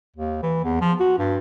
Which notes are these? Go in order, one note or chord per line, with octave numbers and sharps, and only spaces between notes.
D#2
E3
E2
F3
F#4
G2